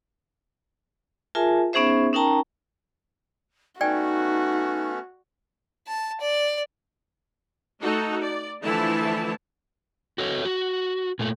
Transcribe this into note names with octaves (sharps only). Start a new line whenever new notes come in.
F4 G#4 A#4 E5 G#5 A5
B3 C#4 D#4 G#4 C5 E5
C#4 D#4 A#4 G5 A5 A#5
A3 B3 C#4 D#4 F#4 D5 G5 G#5
A5
D5
A3 D#4 F#4 A4
D5
D3 E3 F3 A3 E4 A5
F#4 A4 C#5
F#4
A#2 A3